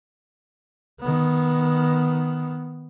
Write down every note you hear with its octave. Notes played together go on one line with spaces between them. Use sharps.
D#3 B3